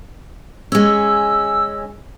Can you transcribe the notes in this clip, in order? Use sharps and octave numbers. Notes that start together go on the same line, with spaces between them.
G#3 C#4 E6